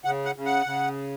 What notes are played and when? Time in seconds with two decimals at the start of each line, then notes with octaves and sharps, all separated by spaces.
0.05 C#3 F#5
0.25 F#5
0.36 C#3
0.45 F#5
0.66 C#3